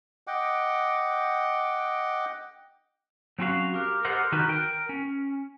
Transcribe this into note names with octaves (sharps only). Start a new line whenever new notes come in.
D#5 F#5 G5 D6
F#3 C4 C#4 F#4 F5
G4 A#4
G4 A4 A#4 C5 D#5 F#5
D#3 D#4 F#4 G4 A#4 B4
A#4 G5
C#4